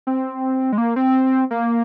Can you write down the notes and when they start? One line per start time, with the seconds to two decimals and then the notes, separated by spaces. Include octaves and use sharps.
0.07 C4
0.72 G#3
0.78 A#3
0.96 C4
1.51 A#3